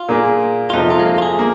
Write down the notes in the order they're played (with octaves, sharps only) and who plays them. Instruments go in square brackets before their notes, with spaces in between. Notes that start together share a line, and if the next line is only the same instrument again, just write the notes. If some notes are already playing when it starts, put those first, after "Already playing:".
Already playing: [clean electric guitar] F4
[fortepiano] A#2 A#3 G#4
[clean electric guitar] F4
[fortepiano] F2 C3 F3 [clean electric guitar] D#4
[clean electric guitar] F4
G#3
A#3
F4
G#4
[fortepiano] A#3